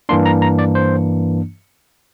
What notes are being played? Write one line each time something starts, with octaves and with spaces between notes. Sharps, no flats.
G2 E3 A#3 D4 C6
A#5
A#5
D5
C5